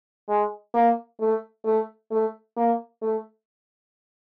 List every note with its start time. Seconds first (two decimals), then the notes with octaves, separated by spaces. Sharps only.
0.29 G#3
0.74 A#3
1.20 A3
1.65 A3
2.11 A3
2.57 A#3
3.02 A3